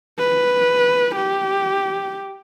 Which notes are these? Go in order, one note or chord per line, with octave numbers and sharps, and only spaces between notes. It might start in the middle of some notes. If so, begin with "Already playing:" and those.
B4
G4